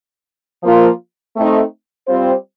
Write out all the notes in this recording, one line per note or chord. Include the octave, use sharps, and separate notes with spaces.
F3 A#3 F4
A3 C4 D#4
G3 C4 F4 C5